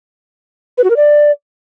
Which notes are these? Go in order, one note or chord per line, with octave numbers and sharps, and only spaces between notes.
B4
F#4
A#4
D5